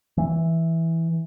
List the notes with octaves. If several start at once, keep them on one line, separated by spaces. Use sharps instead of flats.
E3